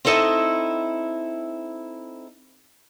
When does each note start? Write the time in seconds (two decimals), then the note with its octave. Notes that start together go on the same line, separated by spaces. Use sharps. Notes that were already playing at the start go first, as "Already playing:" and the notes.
0.05 C4 D#4 E4 A4 D#5 E5